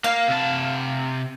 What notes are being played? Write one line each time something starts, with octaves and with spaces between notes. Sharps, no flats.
A#3 F5
C3 A5